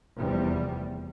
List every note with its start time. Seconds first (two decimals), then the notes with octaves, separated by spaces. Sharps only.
0.18 F1 E2 C3 G3